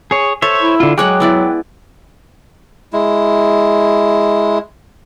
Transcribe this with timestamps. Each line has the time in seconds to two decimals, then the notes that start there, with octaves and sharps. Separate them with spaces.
0.11 G#4 C#5
0.42 A4 C5 C#5 E5
0.61 E4
0.80 D3 F4
0.98 F#3 G#3 C#5 F#5 G5 D6 F#6
1.20 B3 E4 D5
2.93 G#3 E4